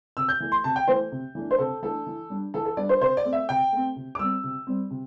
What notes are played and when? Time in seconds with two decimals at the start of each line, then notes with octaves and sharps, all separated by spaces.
0.17 C3 E6
0.29 G6
0.40 E3 A3
0.52 C6
0.64 C3 A5
0.76 G5
0.88 E3 A3 C5
1.12 C3
1.35 E3 A3 D4
1.51 C5
1.59 C3 A4
1.82 E3 A3 D4 A4
2.07 E3
2.30 G3 D4
2.54 E3 A4
2.65 A4
2.77 G3 D4 D5
2.89 C5
3.01 C3 C5
3.17 D5
3.25 A3 C4
3.33 E5
3.49 C3 G5
3.73 A3 C4
3.96 C3
4.15 D6
4.19 G3 C4 E6
4.44 C3
4.67 G3 C4
4.91 C3